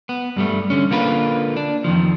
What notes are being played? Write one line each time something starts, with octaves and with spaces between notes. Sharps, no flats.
B3
G2 G3 A3
D3 C#4
D3 A#3 F4 B4
D4
F2 D#3 F3